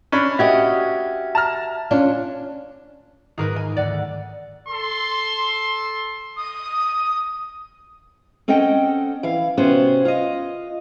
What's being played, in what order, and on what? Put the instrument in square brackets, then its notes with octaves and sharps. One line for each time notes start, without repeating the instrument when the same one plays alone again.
[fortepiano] C#4 D4 B5
[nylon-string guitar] F#4 G4 D#5 [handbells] E5 G#6
[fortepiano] A5 A#5 F6
[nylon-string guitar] C#4 D4 F4
[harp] G#2 D#3 [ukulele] G#4 A#4 B4
[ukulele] G#5
[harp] D2 G#2 F#5 [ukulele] D5
[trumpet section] A4 C6
[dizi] D#6
[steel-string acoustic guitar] C4 C#4 A4 D#5 F#5 G5
E3 F5
C3 B3 C#4 F#4 C5
F4 D#5